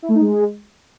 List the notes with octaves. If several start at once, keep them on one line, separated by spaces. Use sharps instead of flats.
E4
A3
D#4
G#3